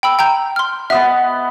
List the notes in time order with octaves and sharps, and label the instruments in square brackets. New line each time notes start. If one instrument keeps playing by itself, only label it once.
[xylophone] G5 B5 E6
G5 A#5 G6
C6 F6
[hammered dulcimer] B3 D#5 F#5 [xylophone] E5